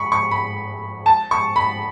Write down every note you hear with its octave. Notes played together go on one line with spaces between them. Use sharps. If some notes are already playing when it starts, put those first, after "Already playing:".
Already playing: B5 C#6
C#6
B5
A5
C#6
B5